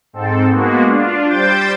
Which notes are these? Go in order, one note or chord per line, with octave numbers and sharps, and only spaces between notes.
G#2 C4 A4
G#3 A#3 B3 F#4
D4 F4
G3 C5 G5 G6 A6